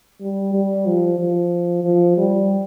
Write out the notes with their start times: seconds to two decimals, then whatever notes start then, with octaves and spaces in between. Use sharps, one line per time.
0.21 G3
0.53 G3
0.86 F3
1.19 F3
1.84 F3
2.18 G3